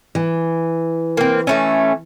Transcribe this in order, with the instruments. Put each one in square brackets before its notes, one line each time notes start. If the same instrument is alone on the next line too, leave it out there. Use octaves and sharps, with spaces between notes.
[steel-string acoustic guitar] E3
[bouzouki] A#3 C4
E3 A3 C#4